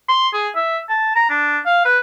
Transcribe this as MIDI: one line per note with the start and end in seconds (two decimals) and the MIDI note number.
0.09 0.29 84
0.34 0.49 68
0.55 0.80 76
0.89 1.12 81
1.15 1.25 82
1.30 1.59 62
1.66 1.84 77
1.85 1.99 71